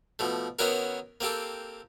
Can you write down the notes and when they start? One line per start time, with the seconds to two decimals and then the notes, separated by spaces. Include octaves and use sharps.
0.19 B2 F3 A3
0.59 D#3 B3 C#4 E4 F#4 A#4
1.21 A#3 C4 G4 A4